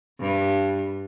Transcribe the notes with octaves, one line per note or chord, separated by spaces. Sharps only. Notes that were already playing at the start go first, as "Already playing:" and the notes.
G2